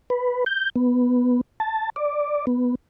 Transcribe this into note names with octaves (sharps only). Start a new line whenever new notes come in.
B4
G6
B3
A5
D5
B3